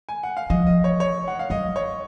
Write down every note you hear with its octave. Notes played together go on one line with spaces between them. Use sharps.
G#5
F#5
F5
F3 D#5
D#5
C#5
C#5
F#5
F5
F#3 D#5
C#5